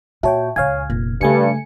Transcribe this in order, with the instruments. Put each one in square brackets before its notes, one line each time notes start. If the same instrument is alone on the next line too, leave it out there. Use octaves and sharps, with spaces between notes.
[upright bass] A#2 [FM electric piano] F#4 C#5 G5 [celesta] E5 A5
[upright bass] C#2 A#2 [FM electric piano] C#5 F5 G#5 [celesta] F6 G#6
[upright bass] F1 [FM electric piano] A#2
[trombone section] G2 [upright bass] C#3 [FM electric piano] A3 G#5 C#7